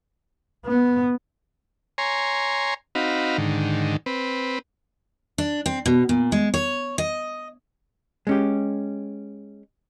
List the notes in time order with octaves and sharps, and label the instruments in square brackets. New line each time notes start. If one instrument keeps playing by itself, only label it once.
[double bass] B3
[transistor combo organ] C#5 G#5 A#5 C6
C4 D#4 F#4 F5 B5
G#2 D3 D#3
C4 B4
[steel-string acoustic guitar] D4
C4
B2
A#2
G#3
C#5
D#5
[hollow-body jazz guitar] G#3 C#4 G4